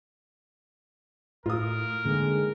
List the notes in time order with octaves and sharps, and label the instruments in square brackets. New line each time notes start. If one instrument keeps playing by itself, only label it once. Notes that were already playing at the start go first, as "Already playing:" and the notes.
[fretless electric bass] A2 [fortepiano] F4 D#6 [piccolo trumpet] A#4
[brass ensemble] A2 D#3 G#3 [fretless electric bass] D3 A#3